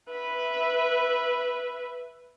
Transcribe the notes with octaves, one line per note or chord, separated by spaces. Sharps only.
B4 E5